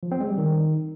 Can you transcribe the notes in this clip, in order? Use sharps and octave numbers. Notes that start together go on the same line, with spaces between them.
F3
C4
G#3
G3
D#3